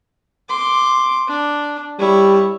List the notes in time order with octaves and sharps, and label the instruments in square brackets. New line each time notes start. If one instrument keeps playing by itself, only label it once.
[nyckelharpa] C6 D6
D4
[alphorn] G3 [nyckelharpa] E4 C#5